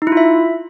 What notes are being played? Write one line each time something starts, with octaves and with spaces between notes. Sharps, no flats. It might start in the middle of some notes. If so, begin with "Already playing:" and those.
D#4
E4
F4
E5